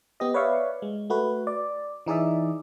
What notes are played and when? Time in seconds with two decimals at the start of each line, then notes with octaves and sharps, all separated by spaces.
0.20 B3 G4 D#5
0.34 B4 C#5 D5 E5 F5 C#6
0.82 G#3
1.10 A3 F#4 B4
1.47 D5
2.06 E3 D#4 G#4 D5 E5